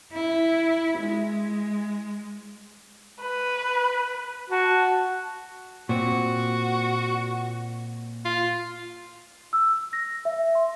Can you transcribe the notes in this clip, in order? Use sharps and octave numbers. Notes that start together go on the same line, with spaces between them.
E4
G#3
B4
F#4 A5
A#2 C4 F#4
F4
E6
A#6
E5
C6